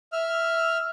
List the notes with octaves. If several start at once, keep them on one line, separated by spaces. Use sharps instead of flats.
E5 F6